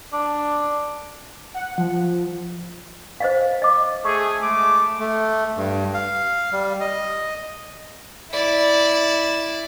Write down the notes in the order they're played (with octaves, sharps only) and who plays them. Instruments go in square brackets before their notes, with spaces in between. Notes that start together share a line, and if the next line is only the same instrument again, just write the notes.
[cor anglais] D4
[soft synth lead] F#5
F3
[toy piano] C5 D#5 F5
D#5 D6
[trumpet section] A3 G#4 [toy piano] C#6
[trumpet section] G#3 A3 D6
[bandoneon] A3
G2
F5
G3
D#5
[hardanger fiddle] E4 D5